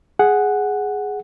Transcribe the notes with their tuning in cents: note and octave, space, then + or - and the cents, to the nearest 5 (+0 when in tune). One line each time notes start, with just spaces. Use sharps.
G#4 +0 F#5 +0